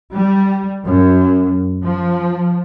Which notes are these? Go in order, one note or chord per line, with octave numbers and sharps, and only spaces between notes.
G3
F#2
F3